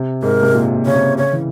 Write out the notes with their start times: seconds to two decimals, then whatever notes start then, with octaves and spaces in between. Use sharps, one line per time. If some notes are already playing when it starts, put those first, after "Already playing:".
Already playing: C3
0.23 G#2 A#4
0.43 C3
0.54 A#2
0.75 A#2
0.86 C#3 C#5
0.96 C3
1.18 C#3 C#5
1.32 E3